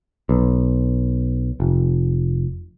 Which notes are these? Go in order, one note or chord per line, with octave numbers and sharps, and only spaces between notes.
B1
F1